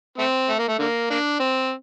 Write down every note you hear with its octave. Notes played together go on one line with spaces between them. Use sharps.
A3 C4
A3
A#3
A3
D3 A#3
A#3 D4
C4